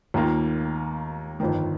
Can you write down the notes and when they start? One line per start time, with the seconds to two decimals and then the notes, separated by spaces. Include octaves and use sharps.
0.14 D#2 D#3 A#3 F4
1.40 G1 F2 D#3